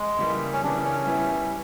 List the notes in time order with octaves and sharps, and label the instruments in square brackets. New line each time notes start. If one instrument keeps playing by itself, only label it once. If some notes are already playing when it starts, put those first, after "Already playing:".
Already playing: [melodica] G#3
[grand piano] C#3 E3 G3 A#3
[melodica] C#4
[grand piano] C#3 E3 G3 A#3 [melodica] D4
[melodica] C#4
[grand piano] G3 B3 E4